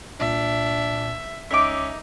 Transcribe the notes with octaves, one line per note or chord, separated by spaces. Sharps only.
C2 A#2 D4 E5
C#2 C#4 D#4 E5 D6 B6